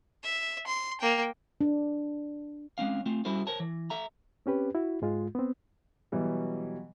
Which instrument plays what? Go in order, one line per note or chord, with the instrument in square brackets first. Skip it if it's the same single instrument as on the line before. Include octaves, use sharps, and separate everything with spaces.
[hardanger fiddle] E5
C6
A#3 G5
[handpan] D4
[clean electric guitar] G#3 C4 C#4 F5
A3 C4 F4
G3 C#4 E4 F#4 A4 C5
A#4 C5 C#5 A5
E3
A4 E5 A#5
[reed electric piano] C4 C#4 G4 B4
E4 F#4
G#2 G#3 F4
B3 C4
[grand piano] B2 E3 F#3 G3